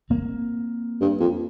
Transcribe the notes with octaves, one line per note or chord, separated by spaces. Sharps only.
A#3 C4
G2
F2